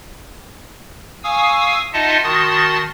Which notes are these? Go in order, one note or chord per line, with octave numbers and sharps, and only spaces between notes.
F5 G#5 C#6 D#6 E6
D#4 F4 D#5 E5 F#5 A5
D#3 F#4 A5 C6 D#6 A6